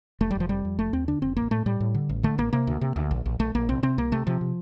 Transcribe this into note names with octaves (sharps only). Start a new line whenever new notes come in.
F1 A3
G3
F1
F3
F2 G3
F2
F1 A3
D#2 C4
D3 D4
F1 C4
A1 A#3
A2 A3
A2 G3
A2
D3
A1
D3 A3
A1 A#3
C3 A#3
D2
C3
D2
A#1
A#1
A#1 A3
A#1 A#3
C2 C4
C3 C4
C2 A#3
C3 A3
C3 F3
C3